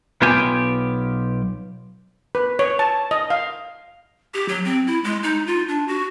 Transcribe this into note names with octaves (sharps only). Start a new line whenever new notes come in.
B1 B3 F4 G4 G5 G#5
B4
C#5
A5
D#5
F5
G4
F#3
C4
E4
G#3
D#4
F4
D4
F#4